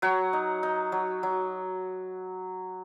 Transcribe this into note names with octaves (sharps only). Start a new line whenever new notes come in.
F#3 C#5 F#5
D#4
D#4
F#3
F#3